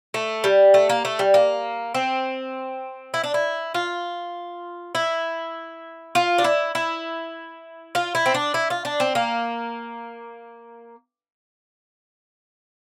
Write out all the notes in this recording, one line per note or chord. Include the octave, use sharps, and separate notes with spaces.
A3
G3
A3
A#3
A3
G3
A#3
C4
E4
D4
E4
F4
E4
F4
D4
E4
E4
F4
E4
C4
D4
E4
F4
D4
C4
A#3